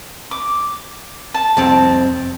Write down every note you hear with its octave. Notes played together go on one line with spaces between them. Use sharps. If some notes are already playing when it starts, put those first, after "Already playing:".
D6
A5
C2 F2 C4 A5